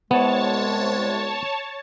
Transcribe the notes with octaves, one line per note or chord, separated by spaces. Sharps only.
C2 C3 G#3 B3 C#5 A5